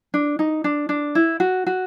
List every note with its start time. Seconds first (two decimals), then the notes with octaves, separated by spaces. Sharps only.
0.14 D4
0.39 D#4
0.64 D4
0.89 D4
1.15 E4
1.40 F#4
1.67 F#4